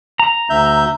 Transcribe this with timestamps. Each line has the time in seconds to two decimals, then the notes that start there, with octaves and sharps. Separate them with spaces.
0.20 A#5
0.50 D2 E5 G6